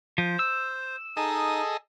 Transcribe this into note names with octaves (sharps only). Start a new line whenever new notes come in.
F3 C5
E6
D#4 G#4 A4 D#5 D#6